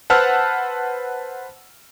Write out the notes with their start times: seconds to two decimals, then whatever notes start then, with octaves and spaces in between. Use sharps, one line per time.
0.10 B4 C5 F#5 A5 E6 F6